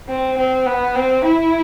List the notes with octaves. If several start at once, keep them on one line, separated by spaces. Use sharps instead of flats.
C4
C4
B3
C4
E4